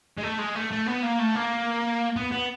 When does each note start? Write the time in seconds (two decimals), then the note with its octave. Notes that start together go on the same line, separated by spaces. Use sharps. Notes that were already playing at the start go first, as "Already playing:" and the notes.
0.18 G#3
0.23 A3
0.39 G#3
0.56 A3
0.72 A3
0.87 B3
1.04 A#3
1.20 A3
1.36 A#3
2.16 B3
2.32 B3